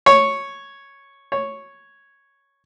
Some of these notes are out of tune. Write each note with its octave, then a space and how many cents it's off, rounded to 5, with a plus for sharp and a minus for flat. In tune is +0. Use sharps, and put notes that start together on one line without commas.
C#5 -5
C#5 -5